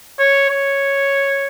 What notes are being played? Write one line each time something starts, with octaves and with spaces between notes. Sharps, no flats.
C#5
C#5